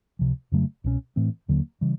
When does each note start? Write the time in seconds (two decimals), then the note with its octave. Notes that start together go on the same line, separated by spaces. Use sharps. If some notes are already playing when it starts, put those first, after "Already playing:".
0.19 C#2 C3 F3
0.52 F2 C#3 F#3 A3
0.84 C2 B2 G#3 C#4
1.16 A2 E3 A3 C4
1.48 D#2 D3 F#3 A#3
1.81 C#3 E3 G3